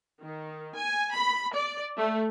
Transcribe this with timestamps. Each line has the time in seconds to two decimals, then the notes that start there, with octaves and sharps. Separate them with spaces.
0.21 D#3
0.75 G#5
1.14 B5
1.52 D5
1.98 A3